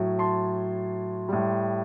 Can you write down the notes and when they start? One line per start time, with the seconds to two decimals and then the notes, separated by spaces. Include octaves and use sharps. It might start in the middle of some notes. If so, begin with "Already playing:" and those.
Already playing: A2 F#3
0.19 A5 C6
1.29 A2 G3